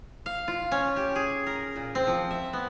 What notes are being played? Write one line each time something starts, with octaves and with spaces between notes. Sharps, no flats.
F5
F4
C#4
G4
G#4
A#4
A#2
C4
F3
E5
B3